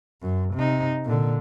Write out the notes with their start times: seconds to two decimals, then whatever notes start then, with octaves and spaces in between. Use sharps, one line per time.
0.21 F#2
0.54 C3 D#4
1.05 A#2 D3